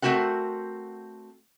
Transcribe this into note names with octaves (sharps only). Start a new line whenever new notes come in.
A3 C4 F#4 A#4 F#5